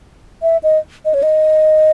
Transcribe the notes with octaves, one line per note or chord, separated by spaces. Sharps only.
E5
D#5
D#5
C#5
D#5